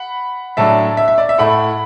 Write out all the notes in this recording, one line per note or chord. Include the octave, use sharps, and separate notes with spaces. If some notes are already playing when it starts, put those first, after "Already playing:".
Already playing: F#5 B5
A2 F#3 D4 E5 A5
E5
E5
D5
E5
A2 A3 E4 F#5 B5